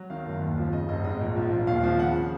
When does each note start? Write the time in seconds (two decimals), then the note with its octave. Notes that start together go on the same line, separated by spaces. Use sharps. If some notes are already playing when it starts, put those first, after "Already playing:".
Already playing: F#3
0.10 D#3 F5
0.26 F#1
0.41 D#2
0.58 F3
0.72 C#3 D#5
0.89 F1 D#5
1.04 G#2 D#5
1.21 A#1
1.36 F3
1.52 A#1
1.67 D#2 F5
1.83 F3
1.99 C#3 F#5